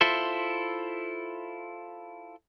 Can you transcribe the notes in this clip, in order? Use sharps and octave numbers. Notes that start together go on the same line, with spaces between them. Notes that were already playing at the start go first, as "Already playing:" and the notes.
E4 F4 A4 C5 E5